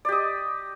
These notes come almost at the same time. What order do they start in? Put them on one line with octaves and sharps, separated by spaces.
D5 G4 D#5